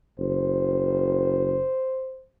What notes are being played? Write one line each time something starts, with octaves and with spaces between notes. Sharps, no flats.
F#1 C5